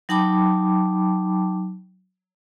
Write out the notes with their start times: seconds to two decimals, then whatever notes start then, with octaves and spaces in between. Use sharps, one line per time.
0.09 F#3 D#4 G5 A5 B5 D6